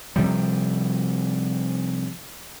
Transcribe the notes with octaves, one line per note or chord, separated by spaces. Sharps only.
C3 F3 G3